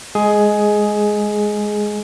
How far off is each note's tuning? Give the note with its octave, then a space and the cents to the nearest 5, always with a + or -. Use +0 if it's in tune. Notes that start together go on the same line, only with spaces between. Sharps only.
G#3 +0 G#4 +10